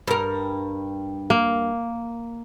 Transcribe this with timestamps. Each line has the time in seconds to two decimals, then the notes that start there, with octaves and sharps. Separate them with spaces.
0.08 G2 A#4
1.30 A#3